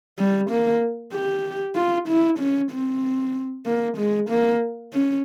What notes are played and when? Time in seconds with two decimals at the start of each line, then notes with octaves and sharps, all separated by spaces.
0.19 G3
0.50 A#3
1.13 G4
1.76 F4
2.08 E4
2.39 C#4
2.72 C4
3.66 A#3
3.97 G#3
4.30 A#3
4.93 C#4